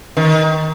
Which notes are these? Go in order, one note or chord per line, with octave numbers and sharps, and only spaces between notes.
D#3